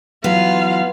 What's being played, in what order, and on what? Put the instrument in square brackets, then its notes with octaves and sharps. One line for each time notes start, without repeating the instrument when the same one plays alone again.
[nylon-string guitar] E3 F#3 [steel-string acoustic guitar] B3 [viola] F4 F5